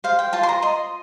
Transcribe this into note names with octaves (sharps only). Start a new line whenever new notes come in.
C5 F5
G5
F4 A5
C6
A#5
D#5 C6